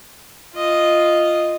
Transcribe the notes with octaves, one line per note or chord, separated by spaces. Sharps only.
F4 D#5